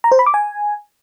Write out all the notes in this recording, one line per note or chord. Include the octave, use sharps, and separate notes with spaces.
A#5
C5
B5
D6
G#5